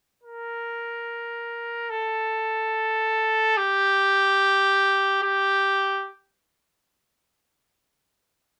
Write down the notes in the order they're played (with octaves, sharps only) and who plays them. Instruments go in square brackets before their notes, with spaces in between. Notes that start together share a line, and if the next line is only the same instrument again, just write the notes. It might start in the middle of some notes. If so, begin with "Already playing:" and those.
[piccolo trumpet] A#4
A4
G4
G4